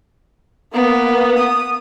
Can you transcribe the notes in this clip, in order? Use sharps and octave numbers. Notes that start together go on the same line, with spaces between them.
A#3 B3
D#6